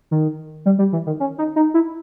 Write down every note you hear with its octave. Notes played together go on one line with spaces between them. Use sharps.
D#3
G3
G3
E3
D#3
C#4
D#4
D#4
E4